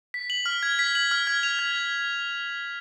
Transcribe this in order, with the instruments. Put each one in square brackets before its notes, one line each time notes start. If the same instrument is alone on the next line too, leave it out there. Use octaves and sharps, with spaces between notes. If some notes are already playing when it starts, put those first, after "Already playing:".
[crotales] B6
F#7
F6
G#6
B6
F#7
F6
G#6
F7
G#6